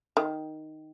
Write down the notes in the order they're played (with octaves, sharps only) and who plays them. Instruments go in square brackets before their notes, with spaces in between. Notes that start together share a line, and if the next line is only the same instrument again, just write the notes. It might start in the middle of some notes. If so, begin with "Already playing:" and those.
[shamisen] D#3